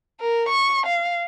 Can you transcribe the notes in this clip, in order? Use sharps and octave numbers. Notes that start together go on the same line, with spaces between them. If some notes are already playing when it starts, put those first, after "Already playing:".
A#4
C#6
F5